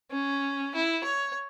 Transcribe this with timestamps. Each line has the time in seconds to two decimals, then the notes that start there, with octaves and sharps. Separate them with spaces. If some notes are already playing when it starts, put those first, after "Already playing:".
0.11 C#4
0.75 E4
1.04 C#5